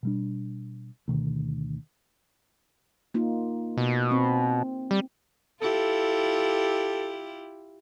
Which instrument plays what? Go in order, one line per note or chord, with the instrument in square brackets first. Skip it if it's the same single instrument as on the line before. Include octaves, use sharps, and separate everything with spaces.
[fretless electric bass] B2 G3 D4
D2 B2 D#3
[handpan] A#3 D#4 F4
[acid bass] B2
[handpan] C4
[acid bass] G3
[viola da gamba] E4 F4 G4 [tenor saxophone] A4